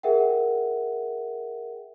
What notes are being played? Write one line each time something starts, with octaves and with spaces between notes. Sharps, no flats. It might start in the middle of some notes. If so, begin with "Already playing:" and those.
G#4 A#4 E5 F#5 G5